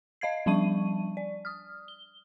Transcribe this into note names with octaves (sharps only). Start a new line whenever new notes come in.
D#5 F5 G#6 C7
F3 G3 D4 A5 C#6 D#7
D5
D#6 F6
G7